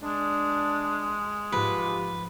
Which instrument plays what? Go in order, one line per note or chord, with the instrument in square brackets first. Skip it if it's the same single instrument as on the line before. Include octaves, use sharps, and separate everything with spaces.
[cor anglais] G#3 [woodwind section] D4
[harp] G#2 F3 [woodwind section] F4 G4 [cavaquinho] B4